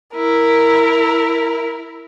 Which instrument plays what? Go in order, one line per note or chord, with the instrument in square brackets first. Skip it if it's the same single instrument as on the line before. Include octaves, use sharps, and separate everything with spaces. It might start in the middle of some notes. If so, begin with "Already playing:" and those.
[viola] E4 [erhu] A#4